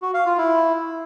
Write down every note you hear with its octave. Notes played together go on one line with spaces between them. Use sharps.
F#4
F5
F4
E4